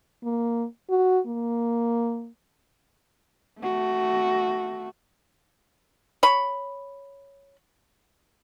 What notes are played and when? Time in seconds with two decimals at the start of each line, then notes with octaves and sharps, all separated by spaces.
0.24 A#3
0.90 F#4
1.27 A#3
3.61 A3 F#4
6.23 C#5 B5